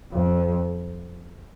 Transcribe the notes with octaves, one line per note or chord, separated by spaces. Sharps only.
F2